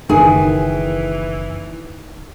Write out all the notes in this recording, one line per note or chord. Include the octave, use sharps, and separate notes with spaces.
F#1 D#3 E3 G#4